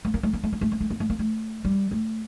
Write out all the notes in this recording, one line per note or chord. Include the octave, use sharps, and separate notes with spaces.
A3
A#3
A3
A#3
A3
A#3
A3
A#3
A3
A#3
A3
A#3
A3
G3
A3